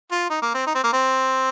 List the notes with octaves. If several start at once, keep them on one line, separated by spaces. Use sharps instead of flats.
F4
D#4
A#3
C4
D#4
C4
A#3
C4